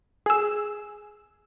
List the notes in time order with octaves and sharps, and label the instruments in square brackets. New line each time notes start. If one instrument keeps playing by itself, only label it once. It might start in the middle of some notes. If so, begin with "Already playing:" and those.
[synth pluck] G#4 E6